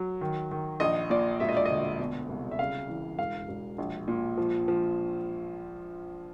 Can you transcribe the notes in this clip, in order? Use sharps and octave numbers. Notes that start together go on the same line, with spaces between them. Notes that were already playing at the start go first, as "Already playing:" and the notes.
Already playing: F#3
D#3
D#3
A#1 D#5
A#2 D5
E1 E5
D#5
D5
D2 D#5
B2
C2
E5
C#3 F5
E3
E1 F5
E1
A#1
A#2
F3
F3